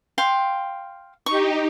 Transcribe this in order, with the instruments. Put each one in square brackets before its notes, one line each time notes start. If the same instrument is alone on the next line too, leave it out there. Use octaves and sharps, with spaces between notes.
[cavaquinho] F5 G5 C6
[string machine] D#4 G4 [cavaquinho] C#6